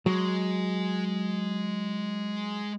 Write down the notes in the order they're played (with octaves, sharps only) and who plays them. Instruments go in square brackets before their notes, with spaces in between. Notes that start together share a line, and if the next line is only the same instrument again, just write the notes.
[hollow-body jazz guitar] F#3 [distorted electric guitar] G#3